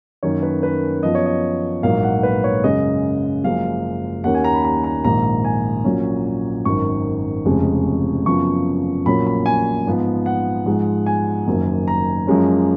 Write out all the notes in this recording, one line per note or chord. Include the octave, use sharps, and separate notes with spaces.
F#2 D#3 A#3 C#4 C#5
B4
B4
F#2 F3 B3 D#5
C#5
D#5
A#1 G#2 F#3 A#3 F5
F#5
B4
C#5
F#2 C#3 G#3 D#5
F#1 F#2 F3 G#3 F5
D#2 D#3 A#3 C#4 F#5
G#5
A#5
B5
A#5
A#5
A#1 G#2 D#3 A#5
G#5
A#1 A#2 F#3 C#4
G#1 F#2 D#3 C#6
F1 F2 C#3 G#3
F#2 C#3 F3 B3 C#6
A#1 A#2 F#3 A#3 C#4 B5
B5
G#5
G#2 F3 B3
F#5
G#2 F3 G#3
G#5
F#1 F#2 D#3 F#3
A#5
F#2 F3 G#3 C#4